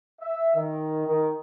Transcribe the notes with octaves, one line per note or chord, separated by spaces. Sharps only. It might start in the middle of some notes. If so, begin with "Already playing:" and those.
E5
D#3
D#3